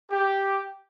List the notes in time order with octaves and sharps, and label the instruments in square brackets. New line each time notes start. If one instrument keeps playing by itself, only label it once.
[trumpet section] G4